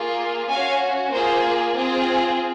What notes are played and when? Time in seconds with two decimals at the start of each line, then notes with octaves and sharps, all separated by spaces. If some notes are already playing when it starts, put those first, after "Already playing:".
Already playing: A#3 F4 G#4
0.49 C#4 F#4 F5 G#5
1.12 A#3 F4 G#4 C5
1.76 C4 F4 G#4